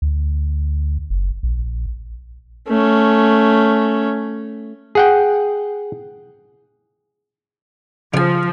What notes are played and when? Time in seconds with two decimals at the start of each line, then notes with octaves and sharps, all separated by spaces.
0.02 D2
1.10 F#1
1.43 A#1
2.69 A3 C#4
4.95 G#4 F#5 G5
8.14 C#3 F3 G#5